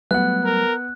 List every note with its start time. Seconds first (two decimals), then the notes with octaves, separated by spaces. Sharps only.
0.11 F#3 G3 A3 B3 F#5 F#6
0.45 A#4